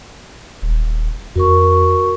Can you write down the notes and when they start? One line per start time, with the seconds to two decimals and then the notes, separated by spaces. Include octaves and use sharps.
0.62 D#1
1.36 F2 F#4 A#4 C#6